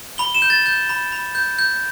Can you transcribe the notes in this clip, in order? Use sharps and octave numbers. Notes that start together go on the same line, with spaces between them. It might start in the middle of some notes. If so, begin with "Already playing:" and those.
B5 G7
E7
G6
A6
G6
B5
B5
G6
G6